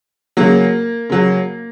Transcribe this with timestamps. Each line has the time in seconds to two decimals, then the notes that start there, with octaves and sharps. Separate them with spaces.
0.37 C#3 F#3 A#3
1.10 C#3 F#3